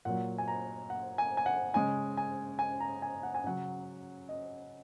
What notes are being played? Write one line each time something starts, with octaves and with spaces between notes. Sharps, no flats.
A#2 F#3 F#5
G#5
A#5
F#5
G#5
G#5
F#5
C#3 G#3 G#5
G#5
G#5
A#5
G#5
F#5
G#5
C#3 F#3 F#5
D#5